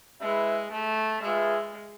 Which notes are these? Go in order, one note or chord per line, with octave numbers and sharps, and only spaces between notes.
G#3 E4 B4 E5
A3
G#3 F4 G#4 B4 E5